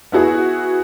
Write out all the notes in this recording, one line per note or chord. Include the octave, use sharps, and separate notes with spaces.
B3 E4 F#4 G#4